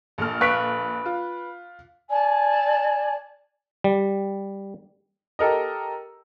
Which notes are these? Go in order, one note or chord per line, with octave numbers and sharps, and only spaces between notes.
A#1 A4 F6
B4 F5 C#6 F#6 B6 D7
F4
D5 G#5 A5
G3
G4 A4 A#4 D#5